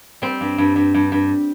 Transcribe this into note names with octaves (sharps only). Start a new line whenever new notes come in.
G3 C4
G2
G2
G2
G2
G2